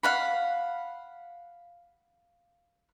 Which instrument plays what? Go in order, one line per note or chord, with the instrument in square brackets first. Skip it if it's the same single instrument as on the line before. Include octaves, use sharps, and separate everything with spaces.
[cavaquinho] F5 F#5 B5